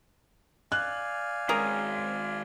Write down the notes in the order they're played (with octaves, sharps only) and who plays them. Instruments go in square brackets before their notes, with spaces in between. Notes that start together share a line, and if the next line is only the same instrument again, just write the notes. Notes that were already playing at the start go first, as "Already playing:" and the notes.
[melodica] D5 F5 G#5 [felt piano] F#6
[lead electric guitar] D#3 G#3 [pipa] C#4 G#4 A#4